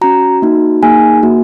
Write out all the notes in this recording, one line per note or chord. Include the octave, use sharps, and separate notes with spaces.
C#4 F#4 A#5
A#3 D#4 F#4
A#3 D#4 G#4 G#5
A#3 F#4